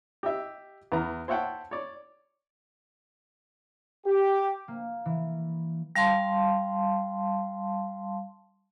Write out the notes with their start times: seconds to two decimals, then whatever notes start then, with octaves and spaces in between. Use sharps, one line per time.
0.23 G4 D#5 E5
0.92 E2 B4 A#5
1.28 C5 C#5 E5 F#5 G5 A5
1.71 C#5 D5
4.07 G4
4.68 A#3
5.05 E3
5.96 G3 F5 A5 C6